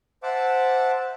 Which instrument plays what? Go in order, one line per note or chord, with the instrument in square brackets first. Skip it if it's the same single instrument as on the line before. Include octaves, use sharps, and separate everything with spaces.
[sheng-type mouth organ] C5 E5 F#5 A5 D6